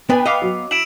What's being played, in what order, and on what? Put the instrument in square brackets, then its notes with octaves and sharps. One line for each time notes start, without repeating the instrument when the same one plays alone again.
[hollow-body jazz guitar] B3 [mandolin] D4 G#5 [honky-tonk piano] B4 G5
[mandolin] B3 F5 D6 [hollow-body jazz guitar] D#5
[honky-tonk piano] F#3
[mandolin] E4 [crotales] D7 E7 F#7